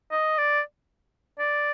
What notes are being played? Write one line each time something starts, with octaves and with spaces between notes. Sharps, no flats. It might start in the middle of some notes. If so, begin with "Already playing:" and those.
D#5
D5
D5